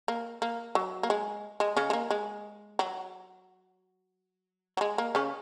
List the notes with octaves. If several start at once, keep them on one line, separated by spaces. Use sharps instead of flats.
A#3
A#3
F#3
A#3
G#3
G#3
C#3 C#4
G#3
A#3
G#3
F#3
F#3
G#3
A#3
C#3 C#4